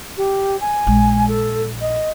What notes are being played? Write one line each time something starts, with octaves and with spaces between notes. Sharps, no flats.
G4
G#5
A#1 G#3
A4
D#5